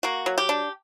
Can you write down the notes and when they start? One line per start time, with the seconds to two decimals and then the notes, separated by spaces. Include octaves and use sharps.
0.03 A#3 F#4
0.26 F#3
0.38 G4
0.49 D4